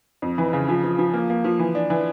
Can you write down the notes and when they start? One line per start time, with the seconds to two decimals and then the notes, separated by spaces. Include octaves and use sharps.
0.22 F2
0.38 E3
0.53 C#3
0.69 F3
0.84 F3
0.99 F3
1.13 A#3
1.30 A#3
1.45 F3
1.59 E3
1.75 D4
1.90 E3